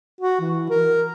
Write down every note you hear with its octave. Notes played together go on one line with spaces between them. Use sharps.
F#4
E3
A#4